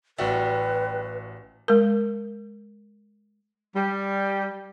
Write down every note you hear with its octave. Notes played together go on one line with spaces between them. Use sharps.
A1 G3 F#4 B4 E5
G#3 A#4
G3